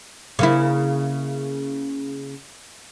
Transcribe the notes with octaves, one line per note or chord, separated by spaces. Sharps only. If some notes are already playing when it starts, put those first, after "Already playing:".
C#3 A#3 E4